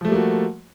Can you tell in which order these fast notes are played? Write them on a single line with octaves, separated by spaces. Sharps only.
F3 A3 G3 A#3 F#4